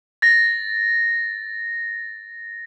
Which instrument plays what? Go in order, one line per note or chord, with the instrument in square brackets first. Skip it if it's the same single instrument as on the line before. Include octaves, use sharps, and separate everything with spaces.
[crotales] A6 A#6